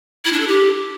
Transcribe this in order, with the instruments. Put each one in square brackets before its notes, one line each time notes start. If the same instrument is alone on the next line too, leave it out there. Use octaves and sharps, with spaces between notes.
[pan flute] E4
D4
A4
G4